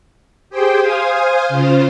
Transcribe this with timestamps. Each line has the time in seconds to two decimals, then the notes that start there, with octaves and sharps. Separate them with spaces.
0.50 G4 G#4 C5 G5
0.82 C5 F5 G#5 D#6
1.49 C#3 F4 C5